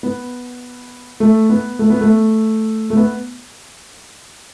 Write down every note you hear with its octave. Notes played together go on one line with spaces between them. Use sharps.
B3
A3
B3
A3
B3
A3
A3
B3